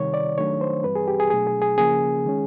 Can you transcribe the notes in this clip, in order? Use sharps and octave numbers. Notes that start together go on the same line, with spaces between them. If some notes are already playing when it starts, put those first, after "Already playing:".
Already playing: C3 D#3 G3 C#5
D5
D#3 F#3 A3 D4 C#5
C5
G2 E3 G3 C4 B4
G#4
G4
G#4
B2 F#3 A3 D4 G#4
G#4
G#4
C#3 F3 A#3 C#4 G#4
D#3 G#3 C#4